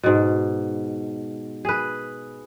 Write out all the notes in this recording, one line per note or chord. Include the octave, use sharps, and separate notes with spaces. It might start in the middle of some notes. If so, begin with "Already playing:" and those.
G#2 B2
G#4 B4